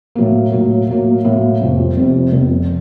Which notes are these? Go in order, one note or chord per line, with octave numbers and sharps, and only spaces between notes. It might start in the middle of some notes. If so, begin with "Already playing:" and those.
A2 F#3 A#3
A2 F#3 A#3
A2 F#3 A#3
A2 F#3 A#3
F1 F2 C3
F1 F2 C3
F1 F2 C3